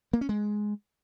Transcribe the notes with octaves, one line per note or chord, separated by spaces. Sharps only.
A#3
C#4
G#3